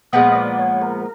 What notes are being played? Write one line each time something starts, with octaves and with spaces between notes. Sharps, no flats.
A#2 F3 G#3 B3 D#5
D5
C#5
A#4